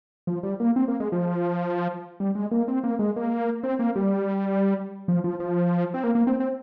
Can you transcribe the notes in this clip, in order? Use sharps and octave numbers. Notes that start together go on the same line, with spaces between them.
F3
G3
A#3
C4
A#3
G#3
F3
G3
G#3
A#3
C4
A#3
G#3
A#3
C4
A#3
G3
F3
F3
F3
C4
A#3
A#3
C4
C4